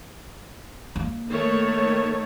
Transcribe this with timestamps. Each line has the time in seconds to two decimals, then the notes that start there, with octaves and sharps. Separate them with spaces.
0.96 A#3
1.27 D#3 A3 C#5